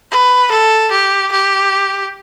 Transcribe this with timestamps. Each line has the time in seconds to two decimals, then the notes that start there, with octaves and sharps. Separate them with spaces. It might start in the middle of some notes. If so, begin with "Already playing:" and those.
0.11 B4
0.51 A4
0.91 G4
1.32 G4